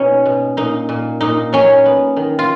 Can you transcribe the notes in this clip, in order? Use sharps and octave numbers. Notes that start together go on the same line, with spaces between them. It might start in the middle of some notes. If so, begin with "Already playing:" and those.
Already playing: B2 C#4 D#4
B2
A#2 D#4
A#2
A#2 D#4
F#3 C#4
B3
D#3
F4